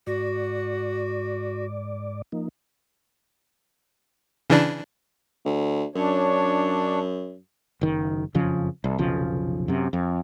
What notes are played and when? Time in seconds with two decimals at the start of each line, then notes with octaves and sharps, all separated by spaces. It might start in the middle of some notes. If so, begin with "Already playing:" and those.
0.07 G#2 F#4 D5
2.32 F3 A#3 D#4
4.50 C#3 E3 D4
5.45 D2
5.95 F#2 D4 C#5
7.81 F#1 D#3
8.35 F#1 F2 C#3 F3
8.84 C2
8.98 F1 B1 C#3 F3
9.68 F#2 C3
9.93 F2